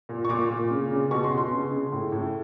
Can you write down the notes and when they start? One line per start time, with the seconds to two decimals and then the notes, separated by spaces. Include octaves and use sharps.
0.09 A#2
0.25 C#6
0.29 A#2 D6
0.50 A#2
0.71 C#3
0.91 C#3
1.11 B2 C#6
1.24 C6
1.31 B2
1.38 C6
1.52 C#3
1.71 C#3
1.92 A2
2.12 A2